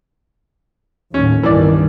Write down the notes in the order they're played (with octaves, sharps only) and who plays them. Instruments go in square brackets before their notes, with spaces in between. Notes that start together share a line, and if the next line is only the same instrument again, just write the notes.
[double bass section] D#2 A2 F#3 [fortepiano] C#4
[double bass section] G1 C2 D#3 [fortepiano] E3 D5